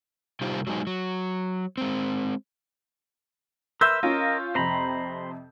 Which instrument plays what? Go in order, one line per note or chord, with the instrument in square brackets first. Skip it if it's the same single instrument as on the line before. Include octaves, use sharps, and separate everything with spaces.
[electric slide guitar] C3 G3 D#4 F4 G4 C5
F#3 G#3 D#4 G#4
F#3
G#3 C4
[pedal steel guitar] A#4 B4 E5 [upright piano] C6 E6 G6
[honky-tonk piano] C#4 F4 [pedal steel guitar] A#4 D#5
[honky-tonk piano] F2 C3 [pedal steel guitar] C5 A#5 B5